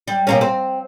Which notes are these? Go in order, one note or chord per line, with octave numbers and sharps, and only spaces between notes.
G3
B2 A#3 C#4
C4